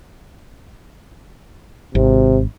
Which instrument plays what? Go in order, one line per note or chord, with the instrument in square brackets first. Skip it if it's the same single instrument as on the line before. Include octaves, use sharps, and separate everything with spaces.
[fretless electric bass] G#1 [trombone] C3